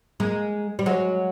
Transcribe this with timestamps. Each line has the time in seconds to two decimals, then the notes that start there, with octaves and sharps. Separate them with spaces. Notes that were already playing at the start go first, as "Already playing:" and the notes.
0.20 G#3 A#3
0.79 G3
0.86 F#3 G#3